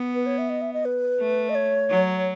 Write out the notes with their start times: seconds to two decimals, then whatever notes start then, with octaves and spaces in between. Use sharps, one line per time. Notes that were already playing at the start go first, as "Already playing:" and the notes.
Already playing: B3
0.15 B4
0.26 C#5
0.38 E5
0.50 D#5
0.62 E5
0.73 D#5
0.85 B4
1.19 A3
1.49 D#5
1.55 C#5
1.89 F#3